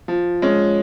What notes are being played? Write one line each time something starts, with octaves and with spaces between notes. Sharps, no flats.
F3
G#3 C#4